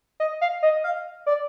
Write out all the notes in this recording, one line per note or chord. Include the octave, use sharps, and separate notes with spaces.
D#5
F5
D#5
F5
D5